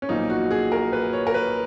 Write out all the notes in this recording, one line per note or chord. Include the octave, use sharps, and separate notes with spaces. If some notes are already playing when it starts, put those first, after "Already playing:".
C#4
B1 A#2 F3 A#3 D#4
F#4
G#4
A#4
B4
C#5
A#4
B4